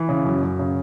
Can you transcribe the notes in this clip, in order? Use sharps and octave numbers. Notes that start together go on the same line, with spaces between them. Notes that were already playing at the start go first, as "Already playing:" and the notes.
Already playing: E3
C#3
F#2
F#2
C#3